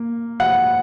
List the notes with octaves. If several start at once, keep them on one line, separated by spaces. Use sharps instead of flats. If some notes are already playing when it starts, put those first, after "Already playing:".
Already playing: A#3
F#5